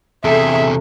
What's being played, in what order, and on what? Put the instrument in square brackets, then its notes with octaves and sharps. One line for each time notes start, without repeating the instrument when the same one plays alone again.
[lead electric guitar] E2 C3 [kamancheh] G#4 E5 [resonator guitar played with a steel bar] A4